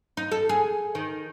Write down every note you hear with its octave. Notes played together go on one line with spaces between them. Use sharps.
D#4
A4
G#4
D#3